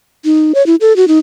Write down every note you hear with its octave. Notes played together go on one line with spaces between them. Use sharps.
D#4
C#5
E4
A4
F#4
D#4